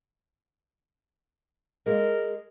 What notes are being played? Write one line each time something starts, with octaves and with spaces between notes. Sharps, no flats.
G#3 A#4